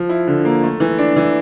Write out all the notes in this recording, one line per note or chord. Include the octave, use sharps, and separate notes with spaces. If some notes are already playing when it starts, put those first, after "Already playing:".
Already playing: F3
E4
D3
A#3
A3
E3
D4
E3